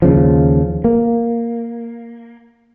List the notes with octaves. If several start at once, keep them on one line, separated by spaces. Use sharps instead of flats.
D#2 C#3 F3
A#3